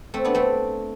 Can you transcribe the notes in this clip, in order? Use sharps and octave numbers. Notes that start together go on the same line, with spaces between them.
A3 C4
B3 D4
A3 C4